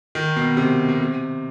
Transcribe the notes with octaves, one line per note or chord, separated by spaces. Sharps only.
D#3
B2
C3
B2
C3